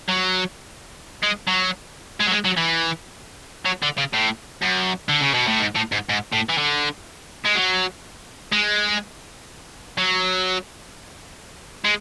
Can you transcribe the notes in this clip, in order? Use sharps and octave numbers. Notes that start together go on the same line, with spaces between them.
F#3
G#3
F#3
G#3
F#3
G#3
F#3
E3
F#3
D3
C#3
A2
F#2
D3
C#3
B2
A2
G#2
A2
G#2
G#2
A2
E3
D3
G#3
F#3
G#3
F#3
G#3